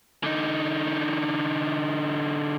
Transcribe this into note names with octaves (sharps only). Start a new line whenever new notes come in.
D3 D#4